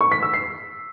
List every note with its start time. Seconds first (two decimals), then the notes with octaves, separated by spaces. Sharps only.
0.01 C#6
0.12 B6
0.23 E6
0.34 C7